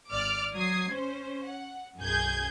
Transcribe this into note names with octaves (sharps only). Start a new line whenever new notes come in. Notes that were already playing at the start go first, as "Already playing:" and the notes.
G#1 D5 D6 F6
F#3 D#6 G#6 C7
C#4 C5
F#5
B1 F#2 G#4 G6 G#6